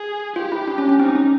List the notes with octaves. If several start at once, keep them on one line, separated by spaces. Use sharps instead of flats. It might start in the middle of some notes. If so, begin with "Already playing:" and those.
Already playing: G#4
F4 G4
E4
D4
C#4
C#4
C4 D#4
C#4